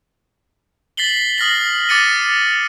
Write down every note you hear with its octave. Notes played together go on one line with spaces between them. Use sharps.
A6 B6 C7 F#7 G7
D#6 F6 A#6 F#7
D6 A6 C#7 D#7